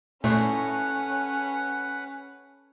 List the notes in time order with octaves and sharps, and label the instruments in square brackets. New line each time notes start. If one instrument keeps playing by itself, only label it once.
[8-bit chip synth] A#2 A3 [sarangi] C#4 [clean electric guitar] A4 C#5 [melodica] B4 F#5